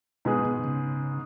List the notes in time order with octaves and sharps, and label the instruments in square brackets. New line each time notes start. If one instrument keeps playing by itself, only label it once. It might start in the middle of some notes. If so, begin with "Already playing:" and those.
[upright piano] G#2 G#3 B3 G#4 [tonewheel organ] B2
[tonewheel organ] B2
C#3